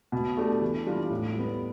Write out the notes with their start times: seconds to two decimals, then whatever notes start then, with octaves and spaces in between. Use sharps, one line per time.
0.12 B2
0.37 A3 D4 G4
0.61 E3
0.87 G3 D4 F4
1.11 A2
1.35 G3 B3